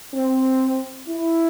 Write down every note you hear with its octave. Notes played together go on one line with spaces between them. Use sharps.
C4
E4